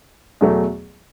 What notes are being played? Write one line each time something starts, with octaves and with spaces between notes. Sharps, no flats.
E2 B2 F#3 A3